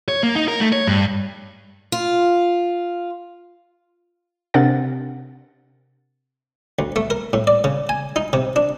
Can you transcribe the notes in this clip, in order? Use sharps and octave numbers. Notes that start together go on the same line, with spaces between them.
C#5
A#3
D#4
A#4
A3
C#5
G2
F4
C3 C4 D4 A#4 F#5 A6
D2
A3
A#4
A2
D5
C#3
G#5
D#4
C3
D4